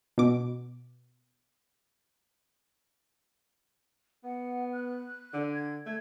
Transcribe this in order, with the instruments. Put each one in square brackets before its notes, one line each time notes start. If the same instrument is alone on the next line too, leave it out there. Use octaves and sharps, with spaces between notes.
[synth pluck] B2 D6
[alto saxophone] B3 [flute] F#5
[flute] F#6
[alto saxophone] D3
[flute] G#6
[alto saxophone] A3 [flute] G#6